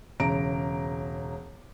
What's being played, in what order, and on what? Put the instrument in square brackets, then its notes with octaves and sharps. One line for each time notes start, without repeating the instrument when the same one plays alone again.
[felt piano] E1 C#3 A#5 D7